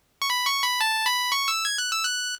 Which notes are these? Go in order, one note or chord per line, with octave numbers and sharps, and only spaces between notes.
C#6
B5
C#6
B5
A5
B5
C#6
E6
G#6
F#6
E6
F#6